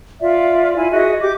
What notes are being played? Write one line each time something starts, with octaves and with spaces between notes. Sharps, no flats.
F4 D5 E5
E4 F4 G#5
F#4 G#4 D#5 E5
G4 D6